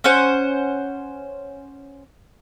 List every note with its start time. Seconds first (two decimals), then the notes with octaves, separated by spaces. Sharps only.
0.04 C#4 C5 F#5